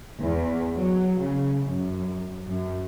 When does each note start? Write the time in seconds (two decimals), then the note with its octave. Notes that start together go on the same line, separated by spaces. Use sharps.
0.21 E2
0.76 F#3
1.20 C#3
1.65 F#2
2.46 F#2